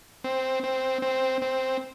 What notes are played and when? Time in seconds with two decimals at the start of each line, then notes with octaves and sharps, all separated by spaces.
0.24 C4
0.63 C4
1.02 C4
1.42 C4